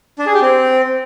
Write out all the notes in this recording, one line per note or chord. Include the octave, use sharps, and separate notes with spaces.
D4
G#4
G4
C4